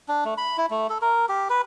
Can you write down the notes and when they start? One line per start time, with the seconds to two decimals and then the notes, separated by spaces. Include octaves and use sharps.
0.08 D4
0.25 A3
0.38 B5
0.58 E4
0.70 A3
0.90 A4
1.02 A#4
1.29 G4
1.50 B4